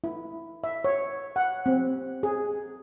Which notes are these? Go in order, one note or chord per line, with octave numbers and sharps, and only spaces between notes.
E4
E5
C#5
F#5
C4
G#4